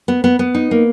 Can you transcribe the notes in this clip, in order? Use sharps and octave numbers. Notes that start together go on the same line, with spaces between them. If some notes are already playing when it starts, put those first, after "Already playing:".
B3
B3
B3
D#4
A#3